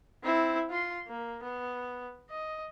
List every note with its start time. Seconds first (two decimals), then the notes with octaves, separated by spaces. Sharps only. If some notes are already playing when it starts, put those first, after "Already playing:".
0.24 C4 E4
0.70 F4 C6
1.08 A#3
1.43 B3
2.30 D#5